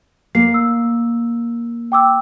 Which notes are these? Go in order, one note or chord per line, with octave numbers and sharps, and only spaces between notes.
A#3 C7
E6
G5 D6 E6